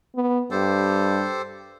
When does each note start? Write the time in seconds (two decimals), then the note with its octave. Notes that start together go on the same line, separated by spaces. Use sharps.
0.16 B3
0.51 G2 G4 A4 C5